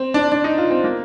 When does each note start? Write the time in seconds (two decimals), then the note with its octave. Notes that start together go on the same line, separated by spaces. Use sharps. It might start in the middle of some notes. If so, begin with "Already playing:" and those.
Already playing: C4
0.14 D4
0.32 D4
0.44 D#4
0.58 F4
0.70 C4
0.84 A#3